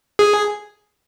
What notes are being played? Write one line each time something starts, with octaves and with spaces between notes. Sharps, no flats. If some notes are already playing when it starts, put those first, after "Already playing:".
G#4